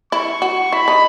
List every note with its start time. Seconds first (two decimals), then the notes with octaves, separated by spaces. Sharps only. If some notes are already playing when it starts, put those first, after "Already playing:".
0.12 E4 C#6
0.42 F#4
0.73 E4 B5
0.88 D#4